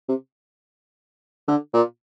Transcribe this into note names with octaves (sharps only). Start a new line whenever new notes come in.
C3
D3
A#2